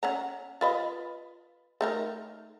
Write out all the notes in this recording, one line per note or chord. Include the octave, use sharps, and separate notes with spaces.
C#4 F#5 A#5
F4 B4 D#5
A3 D#4 A#4